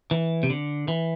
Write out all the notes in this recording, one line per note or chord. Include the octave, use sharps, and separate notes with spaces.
E3
C3
D3
E3